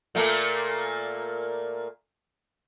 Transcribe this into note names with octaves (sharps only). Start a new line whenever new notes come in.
A#2 A3 A#3